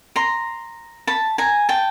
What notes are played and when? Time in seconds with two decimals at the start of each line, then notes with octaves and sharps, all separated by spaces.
0.16 A#5 C6
1.07 A5 B5
1.38 G#5 A#5
1.69 G5 A5